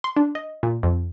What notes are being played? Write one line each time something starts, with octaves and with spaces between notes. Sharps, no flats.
C6
D4
D#5
A#2
F2